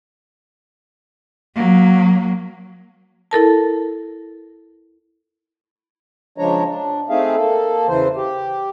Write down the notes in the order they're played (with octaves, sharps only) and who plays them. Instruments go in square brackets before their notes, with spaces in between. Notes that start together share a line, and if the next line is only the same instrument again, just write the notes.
[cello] F#3 A#3
[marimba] E4 A4 A#4 A5
[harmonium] C#3 F3 G#3 D4 C#5 A#5
D4
A3 C4 D#4 G#4 E5 F5
A#3 A4
E2 C#3 E3 C5
G4